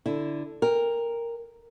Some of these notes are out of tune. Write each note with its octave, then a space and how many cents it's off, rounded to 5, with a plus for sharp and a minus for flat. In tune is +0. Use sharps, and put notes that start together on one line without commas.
D3 +0 E4 +0
A#4 +0 G5 +30